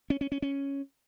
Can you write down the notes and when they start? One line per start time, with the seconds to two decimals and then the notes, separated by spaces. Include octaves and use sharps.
0.10 C#4
0.21 C#4
0.32 C#4
0.42 C#4